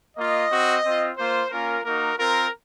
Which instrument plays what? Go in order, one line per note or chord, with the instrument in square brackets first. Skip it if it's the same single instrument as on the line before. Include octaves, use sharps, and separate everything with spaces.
[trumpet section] A#3 F4 D#5
C4 F#4
C4 F4
A#3 F4 C5
A#3 C#4 F4 A#4
A#3 D#4 F#4 A#4
C4 F4 A#4